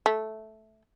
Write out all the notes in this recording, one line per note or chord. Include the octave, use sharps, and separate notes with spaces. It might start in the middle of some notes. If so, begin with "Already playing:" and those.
A3